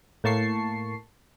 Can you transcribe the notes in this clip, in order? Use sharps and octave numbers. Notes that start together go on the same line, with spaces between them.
A2 A#3 A5 C#6 C7